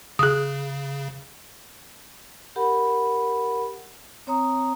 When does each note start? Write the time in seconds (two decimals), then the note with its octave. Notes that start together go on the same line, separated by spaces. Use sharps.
0.19 C#3 G#4 D#6
2.56 G4 A#4 F#5 B5
4.27 C4 C#5 A#5 D#6